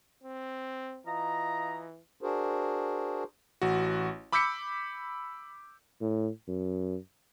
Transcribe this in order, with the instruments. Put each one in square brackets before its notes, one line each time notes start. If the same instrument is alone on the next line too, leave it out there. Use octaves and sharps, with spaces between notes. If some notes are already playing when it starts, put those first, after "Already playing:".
[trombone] C4
[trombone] E3 [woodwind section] F4 D#5 A#5
[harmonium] D4 F#4 G#4 A#4 C5
[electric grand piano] A1 F#4
B5 D6 E6 G6 B6 C#7
[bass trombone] A2
F#2